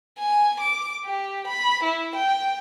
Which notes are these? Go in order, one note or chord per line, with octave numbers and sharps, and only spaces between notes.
G#5
D6
G4
B5
E4
G5